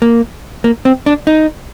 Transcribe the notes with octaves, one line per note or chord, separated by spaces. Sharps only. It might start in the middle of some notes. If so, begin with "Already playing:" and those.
A#3
A#3
C4
D4
D#4